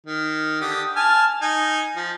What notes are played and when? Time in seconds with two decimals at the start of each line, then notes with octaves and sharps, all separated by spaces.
0.06 D#3
0.60 D3 G4 D#6
0.96 G#5 A5 F6
1.41 D#4 G#5
1.96 F3